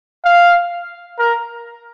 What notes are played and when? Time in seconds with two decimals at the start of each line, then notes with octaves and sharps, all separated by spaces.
0.25 F5
1.19 A#4